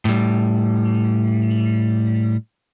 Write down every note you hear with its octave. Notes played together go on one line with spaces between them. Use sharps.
A2 G3